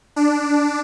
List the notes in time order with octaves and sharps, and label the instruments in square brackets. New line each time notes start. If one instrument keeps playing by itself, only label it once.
[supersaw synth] D4